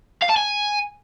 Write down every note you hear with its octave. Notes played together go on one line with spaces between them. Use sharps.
F5
A5
G#5